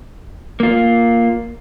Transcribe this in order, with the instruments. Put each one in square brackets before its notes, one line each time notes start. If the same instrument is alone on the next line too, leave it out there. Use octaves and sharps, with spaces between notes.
[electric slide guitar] A#3 F4